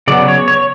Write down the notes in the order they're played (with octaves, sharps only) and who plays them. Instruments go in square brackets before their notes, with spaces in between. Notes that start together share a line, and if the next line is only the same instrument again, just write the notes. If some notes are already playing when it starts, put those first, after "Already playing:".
[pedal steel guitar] C#3 F#3 B3 D5
C#5
C#5